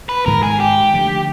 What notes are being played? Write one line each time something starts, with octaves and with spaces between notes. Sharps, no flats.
B4
G#2 D#3 G#3 B3 A#4
G#4
G4
D3 F3 A3